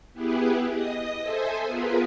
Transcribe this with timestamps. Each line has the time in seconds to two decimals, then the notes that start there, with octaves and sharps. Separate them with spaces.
0.13 B3 E4 G4 G#4 B4
0.68 D#5 D#6
1.21 A4 C5 E5 G#5
1.63 B3 F4 G#4 A#4 B4